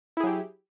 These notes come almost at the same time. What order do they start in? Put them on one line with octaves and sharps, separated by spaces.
E4 G#4 F#3 G4